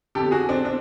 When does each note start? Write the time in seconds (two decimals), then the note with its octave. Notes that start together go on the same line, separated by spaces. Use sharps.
0.15 F2 D3 G4 A4
0.31 F#4 G#4
0.49 C4 D4
0.65 C4 D4